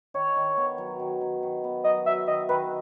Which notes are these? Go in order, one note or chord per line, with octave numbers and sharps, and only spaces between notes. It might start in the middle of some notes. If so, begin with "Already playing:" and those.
D#3 C#5
D#3
B3
F#3
D#3
D#3
D#3
B3
F#3 D#5
F#3 E5
D#3 D#5
D#3 B4